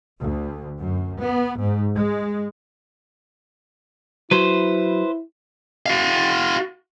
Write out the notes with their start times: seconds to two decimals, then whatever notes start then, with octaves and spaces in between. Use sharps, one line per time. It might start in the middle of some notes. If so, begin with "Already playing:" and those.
0.19 D2
0.79 F#2
1.19 B3
1.59 G#2
1.95 G#3
4.31 F#3 E4 B4 C5
5.86 F#4 F5